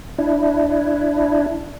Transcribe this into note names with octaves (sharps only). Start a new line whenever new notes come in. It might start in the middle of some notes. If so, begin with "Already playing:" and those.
D4 E4